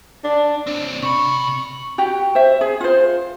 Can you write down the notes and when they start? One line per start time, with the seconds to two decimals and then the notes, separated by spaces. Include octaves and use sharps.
0.24 D4
0.67 C4 D4
1.02 C3 B5 C#6
1.98 F#4 G4
2.35 C5 E5
2.61 G#4
2.81 F4 C5